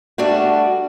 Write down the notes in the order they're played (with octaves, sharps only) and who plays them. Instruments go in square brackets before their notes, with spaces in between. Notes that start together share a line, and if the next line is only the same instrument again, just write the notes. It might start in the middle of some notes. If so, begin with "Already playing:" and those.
[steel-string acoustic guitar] G3 A3 D4 F#4